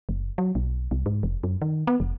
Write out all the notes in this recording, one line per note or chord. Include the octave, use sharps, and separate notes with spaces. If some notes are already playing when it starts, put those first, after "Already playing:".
F#1
F#3
B1
C2
G#2
F1
F#2
D#3
B3
F1